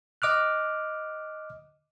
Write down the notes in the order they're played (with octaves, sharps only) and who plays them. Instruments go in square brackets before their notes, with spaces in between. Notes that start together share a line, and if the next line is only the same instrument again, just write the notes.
[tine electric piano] D#5 D6 F6 F#6